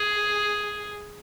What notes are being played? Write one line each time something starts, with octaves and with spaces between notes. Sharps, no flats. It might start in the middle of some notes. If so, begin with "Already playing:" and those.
Already playing: G#4